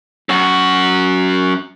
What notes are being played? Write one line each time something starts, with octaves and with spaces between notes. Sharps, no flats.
F#2 F#4